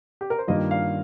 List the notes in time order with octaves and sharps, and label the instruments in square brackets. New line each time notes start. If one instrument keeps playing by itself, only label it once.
[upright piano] G4
A#4
C5
[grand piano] G2 D#3 G3 A#3 F4 [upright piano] D#5
[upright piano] F5